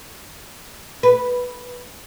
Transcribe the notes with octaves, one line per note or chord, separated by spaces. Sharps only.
B4